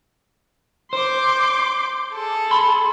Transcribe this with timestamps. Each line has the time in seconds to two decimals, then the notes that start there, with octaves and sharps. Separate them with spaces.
0.93 C5 C6 D6 G6
2.13 G#4 A4
2.51 B5 C6